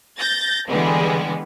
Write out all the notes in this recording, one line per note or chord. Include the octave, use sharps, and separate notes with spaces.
G6 A6 A#6
D3 E3 G3 G#3 B3